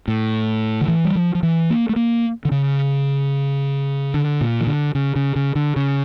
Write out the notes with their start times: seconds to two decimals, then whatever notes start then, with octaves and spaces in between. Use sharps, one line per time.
0.08 A2
0.81 D3
0.88 E3
1.05 G3
1.16 F3
1.35 F3
1.43 E3
1.70 A#3
1.89 A3
1.96 A#3
2.45 D3
2.51 C#3
4.14 D3
4.41 A#2
4.60 E3
4.67 D3
4.95 C#3
5.16 C#3
5.36 C#3
5.55 D3
5.76 C#3